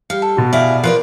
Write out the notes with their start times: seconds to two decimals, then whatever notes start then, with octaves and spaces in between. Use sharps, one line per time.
0.10 G3 F5
0.22 A4
0.37 B2 F#4
0.53 E4 G#4 D5 F5 G#5
0.84 F3 F4 A#4 B4 D5